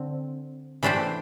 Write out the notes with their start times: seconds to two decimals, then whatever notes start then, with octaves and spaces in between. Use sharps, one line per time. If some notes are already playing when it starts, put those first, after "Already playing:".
Already playing: D3 C4
0.83 E3 A3 D4 G4 C5